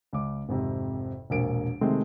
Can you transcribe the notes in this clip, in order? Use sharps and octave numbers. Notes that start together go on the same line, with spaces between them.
C#2 D6
G#1 F2 C3
E1 A#1 A#3 D7
C3 D#3 G#3 A3 C4